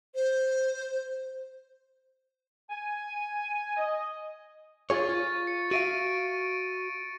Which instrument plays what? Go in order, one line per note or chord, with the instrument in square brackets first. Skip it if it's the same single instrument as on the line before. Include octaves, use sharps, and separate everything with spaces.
[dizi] C5
[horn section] G#5
D#5
[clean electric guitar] F4 G#4 C#5 [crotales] C#6 A6
[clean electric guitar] F4
[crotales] C#7
[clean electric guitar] F#4 E5 F5 [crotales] A#6 D7 D#7